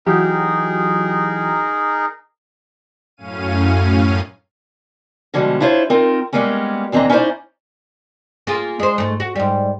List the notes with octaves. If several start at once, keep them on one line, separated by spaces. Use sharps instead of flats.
E3 F#3 D#4 G4 G#4 A#4
F#2 A2 C#4 F5 D#7
B2 D3 F3 G3 G#3
D4 E4 F4 C5 C#5
C4 D#4 F4 A#4
G3 G#3 A#3 B3 C#4
D#2 E3 C4 D4 D#5 A#5
C#4 D#4 E4 F#4 C5 D5
A#3 F4 G#4
G#3 C5
G#2 A3
F#4
G#2 G3